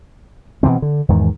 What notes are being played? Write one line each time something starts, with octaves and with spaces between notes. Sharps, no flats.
B2 D3 E3 C4
D3
E2 G#2 D#3